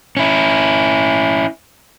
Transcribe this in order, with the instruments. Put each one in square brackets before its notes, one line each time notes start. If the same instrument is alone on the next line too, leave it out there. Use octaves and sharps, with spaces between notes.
[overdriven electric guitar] C#4 E4